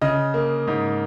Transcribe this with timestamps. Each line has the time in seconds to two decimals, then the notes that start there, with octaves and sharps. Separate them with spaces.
0.01 C#3 D#5
0.34 A#3
0.67 G#2